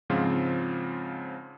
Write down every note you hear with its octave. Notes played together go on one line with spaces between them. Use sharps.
G#2 C#3 F3 C4 F4